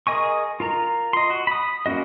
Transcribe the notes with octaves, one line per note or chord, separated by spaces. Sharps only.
G#4 A#4 D#5 G#5 C#6
F4 A#4 A#5
D#5 C6
F#4
B5 D#6
A#3 C#4 F#4 D#5